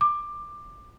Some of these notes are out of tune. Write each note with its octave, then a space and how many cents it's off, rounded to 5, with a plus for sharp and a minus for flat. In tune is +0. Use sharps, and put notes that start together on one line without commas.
D6 +15